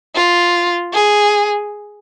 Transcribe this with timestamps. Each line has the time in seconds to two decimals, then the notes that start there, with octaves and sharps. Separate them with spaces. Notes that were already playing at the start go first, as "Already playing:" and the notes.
0.15 F4
0.93 G#4